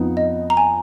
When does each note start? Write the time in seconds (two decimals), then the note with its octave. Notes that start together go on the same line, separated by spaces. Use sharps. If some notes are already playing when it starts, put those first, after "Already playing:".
Already playing: F2 F3 B3 D#4
0.17 D#5
0.50 A#5
0.57 G#5